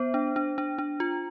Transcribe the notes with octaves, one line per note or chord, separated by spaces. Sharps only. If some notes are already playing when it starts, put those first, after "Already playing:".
Already playing: B3 C5
D4
D4
D4
D4
F4